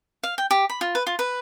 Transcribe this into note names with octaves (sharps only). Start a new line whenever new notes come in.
F5
G5
G4
B5
F4
B4
F4
B4